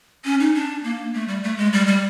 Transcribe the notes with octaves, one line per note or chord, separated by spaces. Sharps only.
C#4
D#4
D4
A#3
A3
G3
A3
G#3
G3
G3